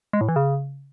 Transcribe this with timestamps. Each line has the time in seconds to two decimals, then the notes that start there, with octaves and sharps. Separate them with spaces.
0.13 G#3
0.21 A2
0.28 E3
0.36 C#3